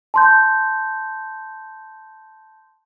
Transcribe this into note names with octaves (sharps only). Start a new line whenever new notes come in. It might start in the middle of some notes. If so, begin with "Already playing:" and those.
A5 C6 G6